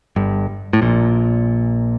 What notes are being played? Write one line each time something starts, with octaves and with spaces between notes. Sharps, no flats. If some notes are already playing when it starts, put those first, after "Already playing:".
G1 G2
A2
A#1 A#2